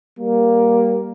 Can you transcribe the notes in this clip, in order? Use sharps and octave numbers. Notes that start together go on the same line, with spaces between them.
G3 A#3